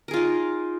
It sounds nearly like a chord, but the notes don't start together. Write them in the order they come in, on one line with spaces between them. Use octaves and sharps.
A#4 G#4 F4 D#4